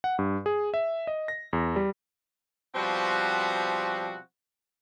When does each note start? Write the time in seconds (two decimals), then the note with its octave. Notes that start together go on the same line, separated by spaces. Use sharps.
0.04 F#5
0.19 G2
0.46 G#4
0.74 E5
1.07 D#5
1.28 A#6
1.53 E2
1.76 G3
2.75 B2 F3 G3 C4 F#4